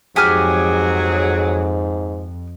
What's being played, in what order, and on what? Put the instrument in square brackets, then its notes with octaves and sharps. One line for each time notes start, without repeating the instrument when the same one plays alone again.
[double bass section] F2 [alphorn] G#2 [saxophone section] F#3 G#4 [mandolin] G4 G#5 F6